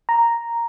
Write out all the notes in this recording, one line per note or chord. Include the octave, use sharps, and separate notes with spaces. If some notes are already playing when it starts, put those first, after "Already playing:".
A#5